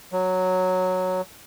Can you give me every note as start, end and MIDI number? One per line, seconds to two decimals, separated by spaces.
0.12 1.21 54